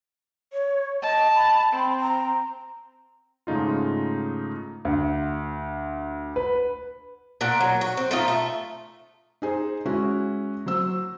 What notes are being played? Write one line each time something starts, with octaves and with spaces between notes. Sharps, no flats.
C#5
D#5 A5
B5
C4
A#5
G#2 C#3 A3 D#4 F4
D2
B4
A#2 A#3 D4 F#5
F#3
F#4
C4
A3 D#4 F4
A3
D#4 G#4 C5
G#3 C#4 E4 F#4
F#3 C5 E6